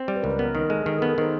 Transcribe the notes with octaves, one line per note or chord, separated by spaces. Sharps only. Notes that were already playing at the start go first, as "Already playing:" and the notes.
Already playing: C4
G3
B4
C#2 A#4
B4
B3 A#4
D#3
G#3 A4
D#3 G#4
B3 A4
A#4
D#3 C5